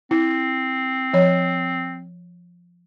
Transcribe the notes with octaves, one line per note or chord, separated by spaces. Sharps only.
C4 E4
F3 C#5